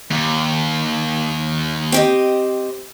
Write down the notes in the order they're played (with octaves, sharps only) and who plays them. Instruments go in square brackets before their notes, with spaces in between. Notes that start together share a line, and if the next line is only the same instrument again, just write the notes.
[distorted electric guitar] D#2
[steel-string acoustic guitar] C4 G4 D#5